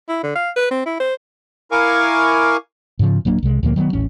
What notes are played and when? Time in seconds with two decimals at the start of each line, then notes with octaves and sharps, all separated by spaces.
0.09 E4
0.23 D3
0.36 F5
0.56 B4
0.71 C4
0.86 E4
1.00 C5
1.71 E4 A#4 F5 G#5 C#6 D6
2.99 G#2 C#3 F3
3.25 D1 F#3 A#3 D4
3.43 C2 C3 G#3
3.63 D2 A#2 F3 A#3
3.76 D#3 F#3 G3 B3
3.93 D#1 A1 C#4